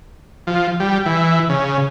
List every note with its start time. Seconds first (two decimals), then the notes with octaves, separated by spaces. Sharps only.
0.47 F3
0.80 G3
1.06 E3
1.49 C#3